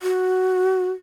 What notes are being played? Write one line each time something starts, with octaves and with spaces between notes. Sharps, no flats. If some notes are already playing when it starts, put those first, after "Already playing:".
F#4